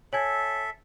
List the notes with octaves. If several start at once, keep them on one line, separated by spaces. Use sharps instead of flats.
A4 C#5 E5 G#5 G#6